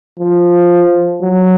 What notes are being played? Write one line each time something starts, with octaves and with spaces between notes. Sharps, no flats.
F3
F#3